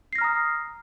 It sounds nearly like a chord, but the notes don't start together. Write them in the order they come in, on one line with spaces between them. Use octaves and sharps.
C7 A#6 F6 A#5 D#6